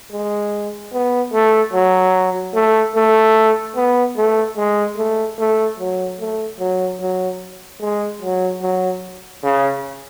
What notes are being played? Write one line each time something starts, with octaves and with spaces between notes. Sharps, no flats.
G#3
B3
A3
F#3
A3
A3
B3
A3
G#3
A3
A3
F#3
A3
F#3
F#3
G#3
F#3
F#3
C#3